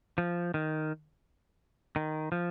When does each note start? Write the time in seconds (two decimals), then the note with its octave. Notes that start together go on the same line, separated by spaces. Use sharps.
0.18 F3
0.54 D#3
1.96 D#3
2.32 F3